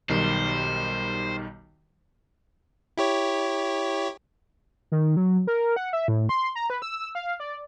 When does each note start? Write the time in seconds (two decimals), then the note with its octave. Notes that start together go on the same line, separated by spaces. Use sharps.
0.09 B1 D#3 G3 C5
2.97 E4 G4 C#5
4.92 D#3
5.16 F#3
5.47 A#4
5.76 F#5
5.93 E5
6.08 A2
6.29 C6
6.56 A#5
6.70 B4
6.82 E6
7.15 F5
7.40 D5